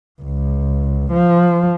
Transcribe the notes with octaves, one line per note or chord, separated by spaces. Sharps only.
C#2
F3